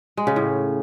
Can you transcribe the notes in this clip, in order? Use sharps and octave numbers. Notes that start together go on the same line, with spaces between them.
G#3
C#3
A2